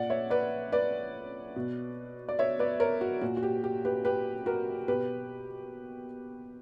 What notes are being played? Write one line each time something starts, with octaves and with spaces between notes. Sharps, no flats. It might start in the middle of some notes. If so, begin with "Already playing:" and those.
Already playing: A#2 D5 F#5
C#5 E5
B4 D5
B4 D5
B2
D5
C#5 E5
B4 D5
A#4 C#5
F#4
A#2 F#4
F#4
G4
G4
G4 B4
G4 B4
F#4 A#4
B2 G4 B4